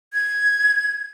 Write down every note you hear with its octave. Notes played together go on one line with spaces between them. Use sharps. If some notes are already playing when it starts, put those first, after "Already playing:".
G#6